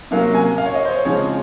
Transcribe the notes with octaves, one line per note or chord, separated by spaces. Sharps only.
C3 F#3 A#3 C#4 F5
G#5
F5
C#5
D#5
C5
C#5
C#3 F3 G#3 C4 C#5